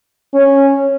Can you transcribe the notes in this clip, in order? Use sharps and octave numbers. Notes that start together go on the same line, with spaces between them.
C#4